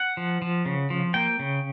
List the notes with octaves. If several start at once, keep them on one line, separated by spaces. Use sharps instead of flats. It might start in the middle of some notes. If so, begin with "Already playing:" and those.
Already playing: F#5
F3
F3
C#3
F3
A#3 G5
C#3